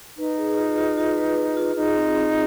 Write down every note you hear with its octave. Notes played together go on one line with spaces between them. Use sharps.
D#4 B4
G#4
F4
F4
F4
B4
F4
F4
D#4 G#4
C4
C4